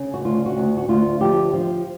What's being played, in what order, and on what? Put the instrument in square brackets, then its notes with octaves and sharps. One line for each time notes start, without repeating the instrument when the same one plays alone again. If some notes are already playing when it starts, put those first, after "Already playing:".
Already playing: [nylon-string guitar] C#3
F#4
D2 F4
F#4
D2
F#4
D2 F4
F3 G4
F3